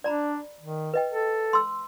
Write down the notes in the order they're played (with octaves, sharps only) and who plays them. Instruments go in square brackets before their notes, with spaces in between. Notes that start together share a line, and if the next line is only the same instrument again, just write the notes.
[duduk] D4 [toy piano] D5 A#5 B5
[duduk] D#3
[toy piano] B4 D#5 G5
[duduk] A4
[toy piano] C6 E6